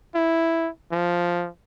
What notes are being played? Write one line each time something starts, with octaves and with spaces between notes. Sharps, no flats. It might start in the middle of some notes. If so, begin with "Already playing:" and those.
E4
F3